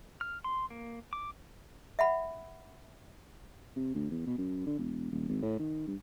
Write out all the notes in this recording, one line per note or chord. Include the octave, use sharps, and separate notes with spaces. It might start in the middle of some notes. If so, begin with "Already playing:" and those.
F6
C6
A#3
D6
E5 F#5 B5
C3
D2
E2
B2
F#2
D3
E1
D#1
G#1
A2
D#3
G2